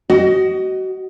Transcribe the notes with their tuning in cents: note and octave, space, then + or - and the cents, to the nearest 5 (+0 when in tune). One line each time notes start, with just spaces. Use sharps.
F#4 +30 D#5 +0